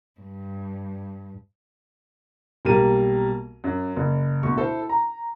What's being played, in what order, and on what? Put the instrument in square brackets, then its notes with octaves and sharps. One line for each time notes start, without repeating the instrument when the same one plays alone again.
[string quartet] G2
[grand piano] B1 G3 A#3 A#4 D#7
F#2
F#1
D2 B2 C#6
E4 A4 C5
A#5